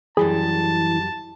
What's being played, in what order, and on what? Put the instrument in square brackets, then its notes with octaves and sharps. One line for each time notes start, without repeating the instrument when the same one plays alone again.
[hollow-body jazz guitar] F#2 G3 B5 [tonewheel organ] E3 [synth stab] G#4 [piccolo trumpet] A5